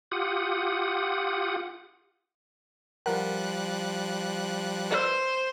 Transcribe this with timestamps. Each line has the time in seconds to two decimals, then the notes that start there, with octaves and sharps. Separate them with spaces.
0.11 F4 G4 F#5 D#6
3.06 F3 G3 A#4 F#5 F#6
4.90 B4 C5 D5 E6